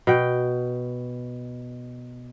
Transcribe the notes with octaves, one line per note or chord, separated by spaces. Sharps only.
B2 G5